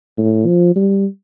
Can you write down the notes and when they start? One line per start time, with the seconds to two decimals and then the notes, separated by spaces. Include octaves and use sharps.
0.17 A2
0.46 F3
0.76 G3